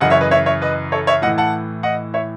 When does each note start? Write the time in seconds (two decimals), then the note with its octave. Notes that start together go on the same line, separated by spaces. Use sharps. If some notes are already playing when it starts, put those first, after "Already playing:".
0.01 F#2 C#3 E3 D#5 F#5
0.10 C#5 E5
0.21 B4 D#5
0.31 C#5 E5
0.46 C#5 E5
0.62 B4 D#5
0.92 A4 C#5
1.07 C#5 E5
1.22 A2 D#5 F#5
1.26 E3
1.38 F#5 A5
1.83 D#5 F#5
2.14 C#5 E5